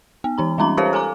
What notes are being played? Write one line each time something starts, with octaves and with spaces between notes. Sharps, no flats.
B3
E3 D#4 A#5
G3 G#3 C#4 D#4 A#5
F4 G4 A#4 C5 C#5 F5
A4 G#5 A#5 D6